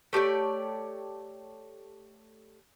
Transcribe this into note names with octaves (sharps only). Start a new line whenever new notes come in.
A3 G4 C#5 D5